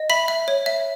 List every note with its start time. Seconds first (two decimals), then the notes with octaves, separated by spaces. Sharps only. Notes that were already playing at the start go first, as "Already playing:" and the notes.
Already playing: D#5
0.10 E5 B5 B6
0.28 E5
0.48 C#5
0.66 E5